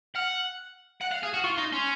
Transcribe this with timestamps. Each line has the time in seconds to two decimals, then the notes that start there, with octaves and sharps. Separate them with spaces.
0.15 F#5 F6
1.01 F#5 F#6
1.11 F5 F#6
1.23 G#4 F6
1.34 F#4 F6
1.44 F4 C#6
1.58 D#4 C6
1.72 C#4 C6